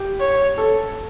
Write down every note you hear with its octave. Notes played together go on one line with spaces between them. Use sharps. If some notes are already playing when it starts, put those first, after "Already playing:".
Already playing: G4
C#5
A4